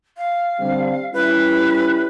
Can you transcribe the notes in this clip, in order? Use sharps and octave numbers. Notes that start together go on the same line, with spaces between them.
F5
D3 G3 C4
G3 C#4 E4 B4